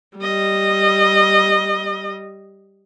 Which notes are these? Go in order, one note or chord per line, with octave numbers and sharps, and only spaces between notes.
G3 D#5